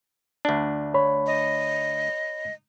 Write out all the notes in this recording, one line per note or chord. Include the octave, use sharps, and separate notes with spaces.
D2 D4
C#5 B5
D#5